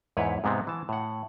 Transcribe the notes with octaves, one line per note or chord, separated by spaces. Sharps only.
E2 G#2 E4 B4 C#5
G#2 C3 G#3 B3 C4
E3 A5
A2 F#5